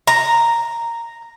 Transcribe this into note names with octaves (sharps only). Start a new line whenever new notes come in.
A#5